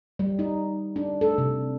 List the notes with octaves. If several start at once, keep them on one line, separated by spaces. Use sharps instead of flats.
G3
D#4
D4
A4
C3